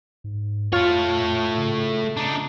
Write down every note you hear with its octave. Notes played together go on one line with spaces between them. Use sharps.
G#2
F2 A3 F4 C#5
C#3
D4 D#4